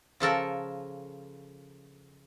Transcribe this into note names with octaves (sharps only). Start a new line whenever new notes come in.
C#3 F3 A4 A#4